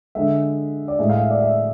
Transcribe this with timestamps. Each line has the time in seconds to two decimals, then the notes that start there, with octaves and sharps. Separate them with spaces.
0.15 D3 G#3 E5
0.88 D5
0.99 A2 G#3 E5
1.09 F5
1.20 E5
1.31 D5
1.41 E5